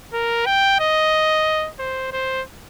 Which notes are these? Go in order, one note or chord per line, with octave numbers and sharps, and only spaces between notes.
A#4
G5
D#5
C5
C5